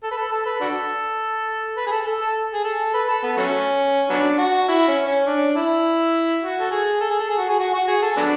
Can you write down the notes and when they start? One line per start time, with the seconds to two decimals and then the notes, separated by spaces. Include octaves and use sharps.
0.03 A4
0.11 B4
0.17 A4
0.32 A4
0.46 B4
0.61 D4 F#4 A4
1.77 B4
1.87 G#4
1.91 A4
2.06 A4
2.21 A4
2.54 G#4
2.64 A4
2.94 B4
3.08 A4
3.23 B3
3.37 F#3 A3 C#4
4.10 F#3 B3 D4
4.38 F#4
4.69 E4
4.88 C#4
5.07 C#4
5.26 D4
5.56 E4
6.42 F#4
6.60 A4
6.71 G#4
7.01 A4
7.10 G#4
7.20 A4
7.30 G#4
7.38 F#4
7.48 G#4
7.60 F#4
7.74 F#4
7.87 G#4
8.02 A4
8.17 F#3 B3 D4